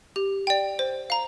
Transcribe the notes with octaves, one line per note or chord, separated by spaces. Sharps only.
G4
D5 G5
C5
F5 A#5